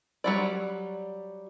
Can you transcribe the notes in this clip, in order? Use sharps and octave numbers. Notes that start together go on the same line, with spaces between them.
F#3 G3 D5